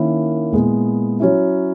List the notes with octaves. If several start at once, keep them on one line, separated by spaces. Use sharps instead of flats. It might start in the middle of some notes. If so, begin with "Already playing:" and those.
Already playing: D#3 A#3 C#4 E4
A#2 G#3 B3 E4
F#3 C#4 E4